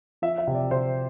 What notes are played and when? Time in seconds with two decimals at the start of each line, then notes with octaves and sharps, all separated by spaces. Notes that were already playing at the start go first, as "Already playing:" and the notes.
0.22 F3 E5
0.38 E5
0.47 C3
0.54 D5
0.71 C3 C5